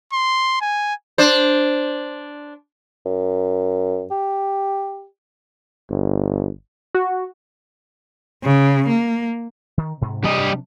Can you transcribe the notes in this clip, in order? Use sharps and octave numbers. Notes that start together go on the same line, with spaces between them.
C6
G#5
D4 C5
F#2
G4
G1
F#4
C#3
A#3
D#3
G#2 C3
C3 G3 D4 D#5